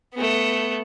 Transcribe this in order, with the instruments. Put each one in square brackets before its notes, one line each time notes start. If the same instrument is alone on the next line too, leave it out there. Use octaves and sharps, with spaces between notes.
[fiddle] A3 B3